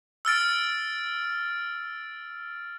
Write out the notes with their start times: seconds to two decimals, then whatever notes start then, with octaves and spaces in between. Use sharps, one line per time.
0.25 E6 F6 A6 D7